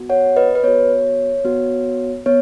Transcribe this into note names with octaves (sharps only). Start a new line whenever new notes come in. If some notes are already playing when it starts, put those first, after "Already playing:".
Already playing: B3 F#4
C#5 F#5
B4 D#5
B4
B3 F#4 C#5
B3 F#4
B3 C#5